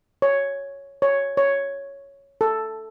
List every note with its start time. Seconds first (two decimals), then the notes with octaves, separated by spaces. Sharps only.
0.22 C#5
1.02 C#5
1.37 C#5
2.41 A4